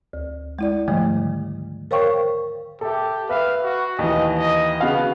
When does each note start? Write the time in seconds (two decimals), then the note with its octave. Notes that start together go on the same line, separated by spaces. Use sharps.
0.13 D2
0.59 G#3 E4 D5
0.88 G#2 D3 D#3 F3 G3 A3
1.91 A#4 C5 C#5 F5 G5 C#6
2.81 G4 A4 E5
3.29 B4 E5 F5
3.62 F#4
3.99 D#2 E3 D#5
4.37 D#5
4.80 C#3 B3 F#4 F5